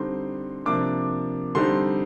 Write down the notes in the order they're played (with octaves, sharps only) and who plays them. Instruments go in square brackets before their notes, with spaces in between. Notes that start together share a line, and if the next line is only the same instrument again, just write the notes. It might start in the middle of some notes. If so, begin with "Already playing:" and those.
Already playing: [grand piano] D3 G3 C4 D#4 C6
C3 F3 A#3 D4 D6
D3 G3 C4 D#4 C6